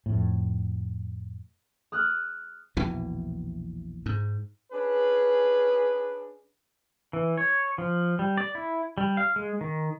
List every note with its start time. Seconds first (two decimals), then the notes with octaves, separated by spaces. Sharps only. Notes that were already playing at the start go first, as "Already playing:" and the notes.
0.06 F2 A2
1.92 D#6 F6 F#6
2.77 A#1 E2 B2 E3
4.06 G#2
4.72 C#4 D4 G#4 B4
7.13 E3
7.38 C#5
7.78 F3
8.19 G3
8.38 D5
8.55 E4
8.98 G3
9.17 F5
9.36 G#3
9.61 D#3